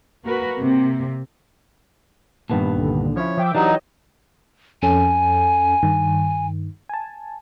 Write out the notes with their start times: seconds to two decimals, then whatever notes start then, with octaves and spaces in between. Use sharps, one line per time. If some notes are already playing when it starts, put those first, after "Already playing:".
0.25 A#3 F#4 A#4 B4
0.58 C3 A#3
2.50 G2 A#2 D#3 B3 A5
2.75 C2 D3
3.16 F3 C#4 E4 C#5
3.37 F3 E5 G5 D6
3.55 E3 F#3 D4 D#4 G4 C#5 D#5
4.82 F2 C#4 A4 G#5
5.83 G2 D#3
6.89 G#5 A5